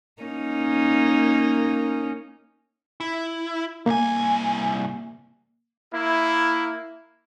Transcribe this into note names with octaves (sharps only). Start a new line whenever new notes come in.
A#3 C#4 D#4
E4
C2 A#3 G#5
A#3 E4